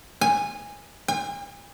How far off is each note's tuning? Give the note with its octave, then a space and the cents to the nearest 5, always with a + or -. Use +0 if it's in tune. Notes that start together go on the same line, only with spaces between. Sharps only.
G#5 -15
G#5 -40